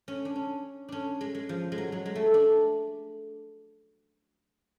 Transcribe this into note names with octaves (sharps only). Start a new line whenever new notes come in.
C#4
D4
C#4
C#4 D4
G#3
G#3
F3
G#3
F#3
F#3
G#3
A3
D4